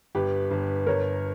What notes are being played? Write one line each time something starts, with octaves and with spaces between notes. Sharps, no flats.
G1 G4 B4
G1
G1 A#4 C#5